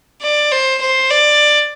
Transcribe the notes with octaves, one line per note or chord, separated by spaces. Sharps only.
D5
C5
C5
D5